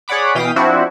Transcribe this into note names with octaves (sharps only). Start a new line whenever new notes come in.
G#4 C#5 D5 F#5 B5 D6
B2 E3 F5 G5 D#6 B6
F3 C4 D4 E4 F#4